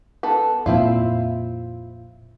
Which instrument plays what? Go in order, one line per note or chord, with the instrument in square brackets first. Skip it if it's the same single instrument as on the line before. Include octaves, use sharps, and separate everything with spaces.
[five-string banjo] B3 A4
[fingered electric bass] F2 A#2 [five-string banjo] C4 E4 F4